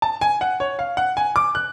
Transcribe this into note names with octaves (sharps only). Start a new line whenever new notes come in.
A5
G#5
F#5
C#5
F5
F#5
G#5
D6
F#6